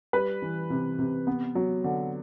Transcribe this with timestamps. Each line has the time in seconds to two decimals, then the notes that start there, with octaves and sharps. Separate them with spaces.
0.13 G3 B4
0.42 E3
0.70 C3
0.99 C3
1.27 B3
1.55 F#3
1.84 D3